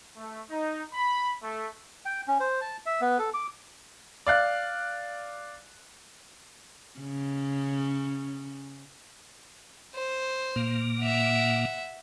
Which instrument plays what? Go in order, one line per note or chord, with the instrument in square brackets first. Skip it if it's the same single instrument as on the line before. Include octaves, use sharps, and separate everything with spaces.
[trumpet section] A3
D#4
B5
A3
[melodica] G5
C#4
C5
A5
E5
B3
A4
D6
[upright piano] D5 F5 F#6
[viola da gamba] C#3 C#4
[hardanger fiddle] C5
[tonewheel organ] A#2 A#3
[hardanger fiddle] E5 F#5